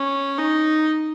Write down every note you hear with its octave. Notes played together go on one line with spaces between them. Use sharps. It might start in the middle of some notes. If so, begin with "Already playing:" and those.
Already playing: C#4
D#4